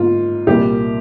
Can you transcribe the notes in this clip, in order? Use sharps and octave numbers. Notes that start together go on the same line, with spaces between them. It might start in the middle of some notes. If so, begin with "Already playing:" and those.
Already playing: G#2 A#3 F4
C2 A#2 G3 A#3 G4